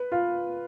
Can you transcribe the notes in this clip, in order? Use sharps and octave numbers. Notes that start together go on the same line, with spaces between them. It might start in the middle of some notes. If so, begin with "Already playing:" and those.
Already playing: B4
F4